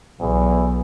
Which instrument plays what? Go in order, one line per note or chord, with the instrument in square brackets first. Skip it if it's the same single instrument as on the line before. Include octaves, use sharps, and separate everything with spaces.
[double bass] B1 [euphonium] E2